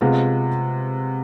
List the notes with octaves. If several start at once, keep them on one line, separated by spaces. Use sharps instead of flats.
C3 G#3 B3 F4